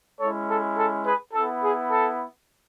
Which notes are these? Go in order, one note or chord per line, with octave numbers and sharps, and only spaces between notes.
G#3 C#4 E4 A4 C#5
A4
A4
G#4 B4
B3 E4 A4
G#4
A4